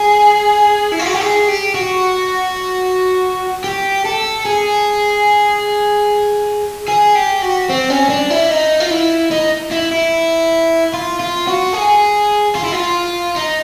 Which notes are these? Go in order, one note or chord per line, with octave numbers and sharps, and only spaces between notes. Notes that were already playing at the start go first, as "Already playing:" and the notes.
Already playing: G#4
E4
F4
F#4
G4
G#4
G4
F#4
G4
A4
G#4
G#4
G4
F#4
C4
C#4
D4
E4
D#4
F4
E4
D#4
E4
E4
F4
F4
F#4
G#4
F4
E4
F4
D#4